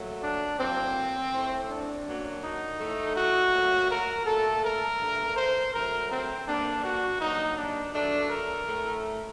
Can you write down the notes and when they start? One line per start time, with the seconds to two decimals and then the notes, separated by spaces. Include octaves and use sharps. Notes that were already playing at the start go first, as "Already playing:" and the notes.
Already playing: A#2 F#3 A3
0.23 D4
0.59 A2 F#3 A#3 C4
1.32 A2 A3
1.69 D4
2.07 F#2 F#3 A#3
2.43 D#4
2.79 A2 A3
3.16 F#4
3.53 A#2 F#3 A3
3.90 A#4
4.26 A#2 A3 A4
4.63 A#4
5.00 G2 D3 A3
5.36 C5
5.73 G2 F#3 A3 A#4
6.10 C4
6.47 G2 D3 G3 A#3 D4
6.83 F#4
7.20 G2 F#3 A#3 D#4
7.57 D4
7.94 G2 F#3 A3 D4
8.30 A#4
8.67 A2 A3